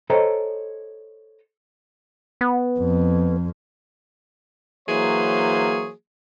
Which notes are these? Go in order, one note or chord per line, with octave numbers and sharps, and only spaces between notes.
A4 C5 C#5 D#5 G5 A#5
B3
F2
E3 F#3 A#3 G#4 C5 C#5